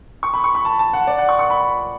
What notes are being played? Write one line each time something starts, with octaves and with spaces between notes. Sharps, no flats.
C#6
B5
C#6
B5
A5
A5
F#5
D5
F#5
C#6
C#6
B5